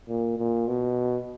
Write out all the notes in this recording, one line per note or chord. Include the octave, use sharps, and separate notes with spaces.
A#2
A#2
B2